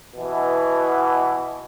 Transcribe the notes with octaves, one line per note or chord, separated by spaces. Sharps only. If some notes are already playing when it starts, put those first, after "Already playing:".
B2 E3